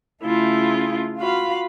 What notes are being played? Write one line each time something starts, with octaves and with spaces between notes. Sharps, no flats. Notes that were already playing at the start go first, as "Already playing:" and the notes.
C#3 A3 E4 F4 G#4
F4 F#4 F5 B5